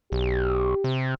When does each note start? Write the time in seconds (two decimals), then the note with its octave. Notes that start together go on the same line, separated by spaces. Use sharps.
0.12 B1 G4
0.84 C3